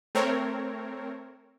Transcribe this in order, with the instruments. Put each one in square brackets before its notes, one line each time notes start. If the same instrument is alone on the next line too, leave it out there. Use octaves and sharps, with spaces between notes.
[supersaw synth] A3 C4 A#4 C#5